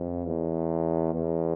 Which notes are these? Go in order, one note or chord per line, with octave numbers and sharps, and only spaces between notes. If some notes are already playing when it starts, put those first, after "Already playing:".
Already playing: F2
E2
E2